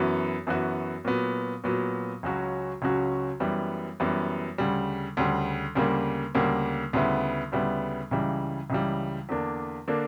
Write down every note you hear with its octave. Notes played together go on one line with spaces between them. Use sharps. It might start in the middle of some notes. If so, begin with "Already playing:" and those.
Already playing: F#2 E3 B3 F#4
F#2 E3 B3 F#4
A#2 F#3 B3
A#2 F#3 B3
C#2 C#3 F#3 C#4 F#4
C#2 C#3 F#3 C#4 F#4
F#2 E3 G3 B3
F#2 E3 G3 B3
D2 C#3 G3
D2 C#3 G3
D2 C#3 G3 A#3
D2 C#3 G3 A#3
D2 C#3 G3 B3 E4
D2 C#3 G3 B3 E4
C#2 C#3 E3 G3
C#2 C#3 E3 G3
E2 D3 A#3 D4
D3 A#3 D4